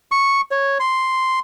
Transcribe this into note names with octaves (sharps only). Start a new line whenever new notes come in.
C#6
C#5
C6